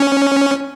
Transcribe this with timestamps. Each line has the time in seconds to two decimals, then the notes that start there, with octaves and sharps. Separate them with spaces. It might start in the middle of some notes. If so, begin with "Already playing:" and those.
Already playing: C#4